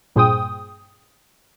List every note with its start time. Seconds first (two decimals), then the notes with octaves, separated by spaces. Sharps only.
0.16 G2 A#2 G#4 C5 G5 D#6